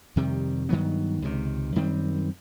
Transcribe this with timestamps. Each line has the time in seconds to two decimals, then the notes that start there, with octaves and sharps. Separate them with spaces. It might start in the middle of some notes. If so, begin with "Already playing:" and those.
0.16 F2 C3 D#3 G3
0.69 G2 D#3 F#3 B3
1.22 C#2 C3 D#3
1.76 F#2 D#3 G3 C4